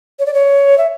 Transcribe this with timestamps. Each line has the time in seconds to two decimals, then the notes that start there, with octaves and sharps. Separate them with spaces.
0.19 C#5
0.26 D5
0.34 C#5
0.78 E5